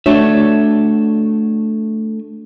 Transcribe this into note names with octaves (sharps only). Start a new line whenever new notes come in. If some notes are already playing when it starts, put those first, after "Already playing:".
A3 D4 F#4 C#5 E5